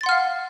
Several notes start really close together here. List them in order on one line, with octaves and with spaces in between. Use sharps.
A6 C6 F#5 F6 F5